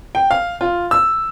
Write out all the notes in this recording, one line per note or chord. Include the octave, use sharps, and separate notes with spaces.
G5
F5
F4
E6